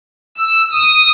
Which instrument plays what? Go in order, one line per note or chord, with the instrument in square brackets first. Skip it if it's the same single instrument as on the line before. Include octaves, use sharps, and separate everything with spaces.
[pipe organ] E6
D#6